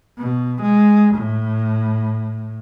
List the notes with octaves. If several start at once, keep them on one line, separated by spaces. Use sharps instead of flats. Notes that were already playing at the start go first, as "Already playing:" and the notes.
B2
G#3
A2